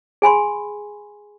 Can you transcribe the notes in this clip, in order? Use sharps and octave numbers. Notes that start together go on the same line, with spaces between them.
G#4 G#5 B5 C6